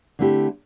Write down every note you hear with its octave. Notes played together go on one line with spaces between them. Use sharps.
D3 A3 C4 E4 G4